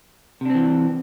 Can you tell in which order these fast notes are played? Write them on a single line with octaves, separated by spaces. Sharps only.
C3 D4 C4 E3